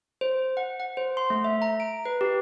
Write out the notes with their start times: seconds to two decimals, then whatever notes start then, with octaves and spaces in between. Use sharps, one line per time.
0.21 C5
0.57 F#5
0.80 F#5
0.97 C5
1.17 C6
1.30 A3
1.44 E5
1.62 A#5
1.80 D7
2.05 B4
2.21 G4